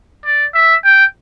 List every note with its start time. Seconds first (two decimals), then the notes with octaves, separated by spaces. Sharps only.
0.25 D5
0.54 E5
0.84 G5